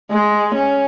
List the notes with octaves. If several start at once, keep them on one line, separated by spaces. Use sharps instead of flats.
G#3
C#4